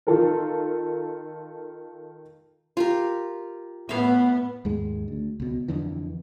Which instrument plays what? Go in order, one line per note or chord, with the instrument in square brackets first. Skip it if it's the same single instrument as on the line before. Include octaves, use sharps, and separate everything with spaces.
[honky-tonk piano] D#3 F4 A4 A#4
[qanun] F4 G4 A#4
[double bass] A2 B3 [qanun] E5 F5
[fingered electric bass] D#2 G#2 G#3
D2
C#2 B2
F2 D3 E3